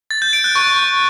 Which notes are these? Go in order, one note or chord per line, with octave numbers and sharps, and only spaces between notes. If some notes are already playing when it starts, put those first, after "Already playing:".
A6
G6
D7
F#6
C#6